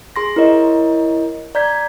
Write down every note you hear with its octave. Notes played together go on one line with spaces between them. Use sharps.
G#4 C6 A#6
E4 A#4 C#5 D#5
D5 A#5 G6 G#6 B6